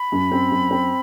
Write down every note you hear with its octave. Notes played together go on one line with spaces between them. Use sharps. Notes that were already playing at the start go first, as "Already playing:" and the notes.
Already playing: B5
F#2
C4
F#2
C4